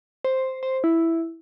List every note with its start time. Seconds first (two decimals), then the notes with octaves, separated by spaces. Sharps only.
0.25 C5
0.63 C5
0.84 E4